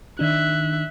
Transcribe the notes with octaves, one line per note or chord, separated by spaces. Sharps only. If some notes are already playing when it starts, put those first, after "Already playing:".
D#3 D4 D#4 E5 F#6